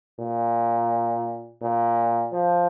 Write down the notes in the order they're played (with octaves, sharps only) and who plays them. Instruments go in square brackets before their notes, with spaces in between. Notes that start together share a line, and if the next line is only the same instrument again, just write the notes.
[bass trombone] A#2
A#2
F3